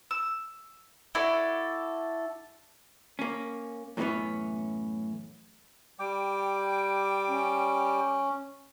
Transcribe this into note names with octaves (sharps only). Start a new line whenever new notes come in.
E6
E4 F#4 A4 D5
A#3 C#4
F#2 A2 E3 G#3 B3 C#4
G3 G5 D6
C#4